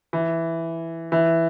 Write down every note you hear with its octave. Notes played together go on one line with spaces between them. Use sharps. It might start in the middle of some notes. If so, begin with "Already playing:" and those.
E3
E3